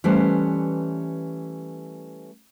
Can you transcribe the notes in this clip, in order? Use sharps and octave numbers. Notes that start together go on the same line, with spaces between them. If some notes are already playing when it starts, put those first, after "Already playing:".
E3 G3 A3 C#4 B4 C5